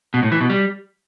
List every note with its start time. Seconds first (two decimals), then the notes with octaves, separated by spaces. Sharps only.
0.14 B2
0.23 A2
0.32 E3
0.41 B2
0.50 G3